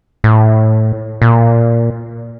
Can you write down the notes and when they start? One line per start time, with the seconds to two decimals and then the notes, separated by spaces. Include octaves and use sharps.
0.24 A2
1.22 A#2